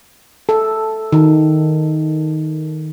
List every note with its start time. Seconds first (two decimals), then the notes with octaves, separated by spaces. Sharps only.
0.49 A4
1.12 D#3